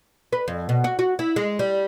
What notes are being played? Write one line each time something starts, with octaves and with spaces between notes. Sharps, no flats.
B4
F2
B2
F#4
F#4
E4
G#3
G3